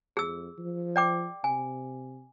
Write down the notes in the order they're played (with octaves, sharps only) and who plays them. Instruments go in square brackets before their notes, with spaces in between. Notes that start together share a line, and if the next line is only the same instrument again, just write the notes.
[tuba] F2 [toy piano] G#4 E6
[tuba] F3
[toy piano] D5 G5 D6
[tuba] C3 [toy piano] G#5